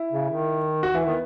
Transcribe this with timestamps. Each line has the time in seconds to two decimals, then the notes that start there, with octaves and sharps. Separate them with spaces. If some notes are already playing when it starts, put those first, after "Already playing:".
Already playing: E4
0.12 C#3
0.29 D#3
0.83 F#4
0.94 E3 E4
1.05 D#3 B3